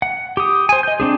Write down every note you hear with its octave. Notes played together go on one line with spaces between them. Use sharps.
F#5
G4 D#6
C5 G#5
D#5 G6
C4 D4 G#4